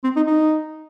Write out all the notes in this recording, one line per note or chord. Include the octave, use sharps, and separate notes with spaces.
C4
D#4
D#4